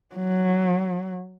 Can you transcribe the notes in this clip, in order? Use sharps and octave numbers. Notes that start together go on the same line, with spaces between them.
F#3